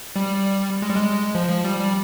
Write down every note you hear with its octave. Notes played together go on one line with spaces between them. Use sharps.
G3
G#3
G3
G#3
F3
F3
G3
G3